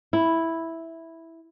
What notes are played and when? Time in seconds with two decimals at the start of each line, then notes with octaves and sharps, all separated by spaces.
0.13 E4